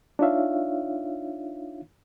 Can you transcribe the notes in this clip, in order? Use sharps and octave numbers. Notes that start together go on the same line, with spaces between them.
D4 D#4 F4 C#5 E5 F5